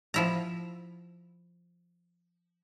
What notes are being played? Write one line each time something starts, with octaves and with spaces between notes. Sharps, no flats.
F3 E4 A#5